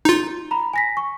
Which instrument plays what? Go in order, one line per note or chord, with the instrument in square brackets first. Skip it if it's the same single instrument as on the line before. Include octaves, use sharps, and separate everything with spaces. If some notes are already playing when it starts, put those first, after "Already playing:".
[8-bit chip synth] D#4 F4
[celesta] A#5 B5
G#5 A#6 B6
C#6